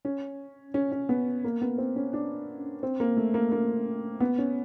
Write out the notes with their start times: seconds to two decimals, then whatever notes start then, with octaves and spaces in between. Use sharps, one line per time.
0.05 C#4
0.74 C#4
0.92 C#4
1.09 B3
1.44 A#3
1.62 B3
1.78 C4
1.96 C#4
2.13 D4
2.83 C4
3.00 A#3
3.17 A3
3.34 A#3
3.52 A#3
4.20 B3
4.38 C#4